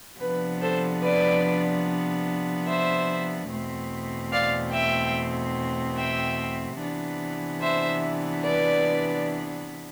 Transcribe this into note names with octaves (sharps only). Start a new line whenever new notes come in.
C3 F3 B3 D4 B4
A4 C5
B4 D5
C5 E5
E2 B2 A3 C4
D5 F5
E5 G5
E5 G5
C3 E3 B3 D4
C5 E5
B4 D5